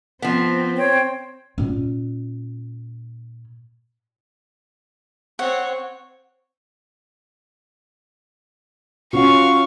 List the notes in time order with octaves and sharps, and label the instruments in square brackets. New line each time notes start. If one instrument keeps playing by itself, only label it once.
[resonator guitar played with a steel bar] F3 B3 [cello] C4
[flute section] C5 C#5 G5
[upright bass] A#2 C#4
[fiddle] C4 C#5 [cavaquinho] F#5
[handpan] C#4 F4 F#4 [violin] F5 C#6